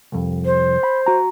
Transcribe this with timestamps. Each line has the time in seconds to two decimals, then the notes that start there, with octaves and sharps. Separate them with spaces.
0.12 C2 F2
0.45 C5
0.83 B5
1.06 F#4 A#5